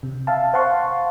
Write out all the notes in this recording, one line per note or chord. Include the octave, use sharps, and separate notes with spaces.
C3
E5 F5 A5
C5 F5 F#5 A5 C6 C#6